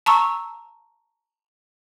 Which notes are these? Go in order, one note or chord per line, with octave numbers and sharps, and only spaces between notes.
A5 A#5 C#6 E6